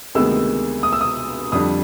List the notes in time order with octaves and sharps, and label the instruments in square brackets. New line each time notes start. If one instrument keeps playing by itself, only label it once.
[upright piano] D2 C3 D#3 G#3 B3 E6
D#6
E6
D#6
F2 D3 G3 D#6